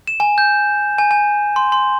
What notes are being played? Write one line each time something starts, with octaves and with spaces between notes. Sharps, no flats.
E7
G#5
G6
G#5
G#5
C6
C6